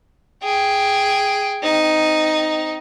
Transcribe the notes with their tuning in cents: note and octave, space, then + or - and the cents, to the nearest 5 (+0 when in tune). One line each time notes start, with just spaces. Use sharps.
G#4 -5 G5 +0
C4 -20 D#4 +0